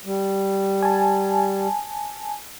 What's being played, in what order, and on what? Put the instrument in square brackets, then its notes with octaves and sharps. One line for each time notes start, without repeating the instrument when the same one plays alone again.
[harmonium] G3
[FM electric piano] G#5 A5